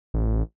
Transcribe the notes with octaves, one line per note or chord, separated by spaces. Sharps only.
A1